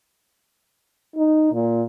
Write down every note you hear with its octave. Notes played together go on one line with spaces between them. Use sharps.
D#4
A#2